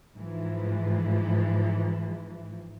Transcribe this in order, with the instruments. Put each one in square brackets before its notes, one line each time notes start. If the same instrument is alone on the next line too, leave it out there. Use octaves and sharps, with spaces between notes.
[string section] G#2 E3 F3